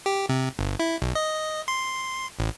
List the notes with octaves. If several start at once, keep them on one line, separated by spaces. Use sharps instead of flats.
G4
C3
G1
E4
B1
D#5
C6
A1